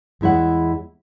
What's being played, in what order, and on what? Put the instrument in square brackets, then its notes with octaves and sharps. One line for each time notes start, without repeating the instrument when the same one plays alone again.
[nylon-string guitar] E2 G#3 E4 C#5 F#5